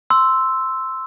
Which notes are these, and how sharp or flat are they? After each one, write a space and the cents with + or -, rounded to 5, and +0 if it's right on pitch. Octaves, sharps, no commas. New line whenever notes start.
C6 -5 E6 +0